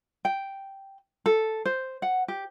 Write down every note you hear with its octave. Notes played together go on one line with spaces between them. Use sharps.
G5
A4
C5
F#5
G4